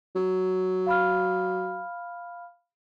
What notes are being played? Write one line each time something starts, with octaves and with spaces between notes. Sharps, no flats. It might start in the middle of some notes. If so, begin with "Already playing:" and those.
F#3
F5 B5 F6